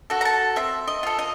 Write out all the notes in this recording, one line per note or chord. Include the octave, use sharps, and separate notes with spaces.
F#4 A4
A#5
A5
C4 E5
D#5
F4 A4
D#5